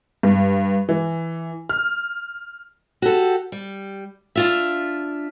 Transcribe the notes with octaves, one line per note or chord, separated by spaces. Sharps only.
G2
E3
F6
F#4 G4 A4
G3
D4 F4 E5